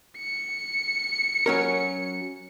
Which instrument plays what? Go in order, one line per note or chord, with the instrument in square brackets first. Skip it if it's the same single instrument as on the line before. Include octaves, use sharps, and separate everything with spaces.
[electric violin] C#7
[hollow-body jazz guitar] F#3 C#4 A#4